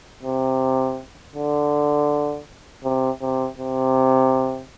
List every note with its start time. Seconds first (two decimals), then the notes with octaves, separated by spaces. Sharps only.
0.23 C3
1.35 D3
2.84 C3
3.22 C3
3.58 C3